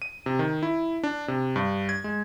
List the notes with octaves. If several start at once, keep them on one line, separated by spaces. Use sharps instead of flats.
D#7
C3
D#3
E4
D4
C3
G2
G#6
G#3